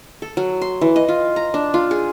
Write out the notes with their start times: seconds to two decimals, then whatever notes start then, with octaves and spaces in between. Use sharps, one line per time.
0.22 A4
0.37 F#3
0.62 C6
0.81 E3
0.96 D#5
1.08 F4
1.36 A#5
1.54 D4
1.74 F4
1.91 G#4